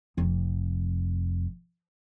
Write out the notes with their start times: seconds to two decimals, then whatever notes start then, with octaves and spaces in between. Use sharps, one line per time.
0.17 F1 F2